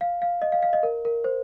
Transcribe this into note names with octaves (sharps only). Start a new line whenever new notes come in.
F5
F5
D#5
F5
F5
D#5
A#4
A#4
C5